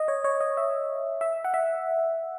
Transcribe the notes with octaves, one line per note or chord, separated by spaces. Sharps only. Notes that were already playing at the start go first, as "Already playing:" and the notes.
Already playing: D#5
C#5
C#5
D#5
E5
E5
F#5
E5